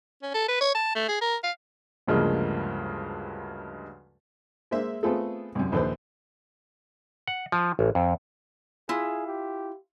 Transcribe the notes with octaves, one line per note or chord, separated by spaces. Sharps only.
C#4
A4
B4
C#5
A5
A3
G#4
A#4
F5
D2 G2 C#3 F3 G#3 A#3
G#3 A#3 C5 E5
A3 B3 C4 F4 G#4 A4
C2 F#2
A#1 D#2 A4 B4 C5
F#5
F3
A1
F2
E4 F4 G#4
G4